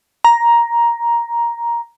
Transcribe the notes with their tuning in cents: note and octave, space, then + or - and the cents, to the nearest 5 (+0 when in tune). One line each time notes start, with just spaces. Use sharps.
A#5 +10